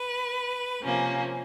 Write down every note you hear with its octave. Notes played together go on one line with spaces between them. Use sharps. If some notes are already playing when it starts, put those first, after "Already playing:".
Already playing: B4
C3 F3 A#3 C#4